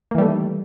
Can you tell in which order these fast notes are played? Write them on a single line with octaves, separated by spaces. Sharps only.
A#3 E3 G3 A3 D#3